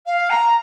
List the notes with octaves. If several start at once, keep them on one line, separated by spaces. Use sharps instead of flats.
F5
A#5